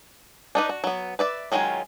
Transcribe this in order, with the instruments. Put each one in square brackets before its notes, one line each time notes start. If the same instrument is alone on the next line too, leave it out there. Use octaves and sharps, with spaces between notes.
[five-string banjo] D4 D#4 B4
F#4
F#3 B3
B4 D5 E5
D#3 F#3 G#3 C#4 F4